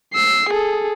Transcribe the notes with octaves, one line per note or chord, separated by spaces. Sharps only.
E6 C7
G#4 A4